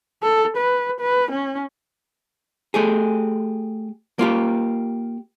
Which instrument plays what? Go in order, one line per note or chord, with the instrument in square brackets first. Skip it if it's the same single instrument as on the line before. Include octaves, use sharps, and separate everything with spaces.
[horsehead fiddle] A4
B4
B4
C#4
[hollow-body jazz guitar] A3 G4 G#4
A#3 F4 G4